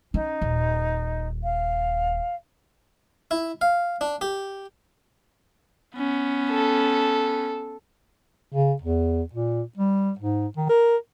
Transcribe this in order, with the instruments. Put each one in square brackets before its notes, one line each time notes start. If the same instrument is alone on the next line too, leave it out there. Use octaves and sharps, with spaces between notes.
[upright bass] C#4 [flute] D#4
[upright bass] D#1
[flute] F5
[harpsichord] E4
F5
D4
G4
[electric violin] B3 C#4
[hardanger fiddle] A4
[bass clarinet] C#3
E2
A#2
G3
G#2
D#3
A#4